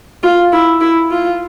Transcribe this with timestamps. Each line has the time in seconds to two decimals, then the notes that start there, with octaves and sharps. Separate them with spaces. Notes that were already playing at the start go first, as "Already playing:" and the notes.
0.23 F4
0.52 E4
0.81 E4
1.11 F4